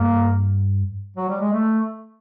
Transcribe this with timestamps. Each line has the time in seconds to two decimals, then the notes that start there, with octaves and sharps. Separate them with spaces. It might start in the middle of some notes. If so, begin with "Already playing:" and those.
Already playing: G2 A#3
1.16 F#3
1.29 G3
1.40 G#3
1.52 A3